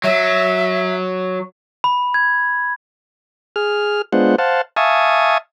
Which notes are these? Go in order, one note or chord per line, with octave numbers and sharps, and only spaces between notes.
F#3 E5
B5
G#6
G#4 F6
G#3 B3 D4 F4 C5 F#5
C5 F5 F#5 A5
E5 F5 G#5 A5 C#6 D#6